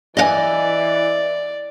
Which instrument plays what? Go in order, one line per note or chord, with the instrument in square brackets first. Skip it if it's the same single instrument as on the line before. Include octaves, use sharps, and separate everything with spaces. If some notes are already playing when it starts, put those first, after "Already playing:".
[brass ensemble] E3 [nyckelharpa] D5 [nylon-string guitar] D#5 F5 G#5